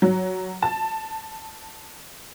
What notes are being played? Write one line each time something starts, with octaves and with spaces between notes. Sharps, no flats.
F#3
A5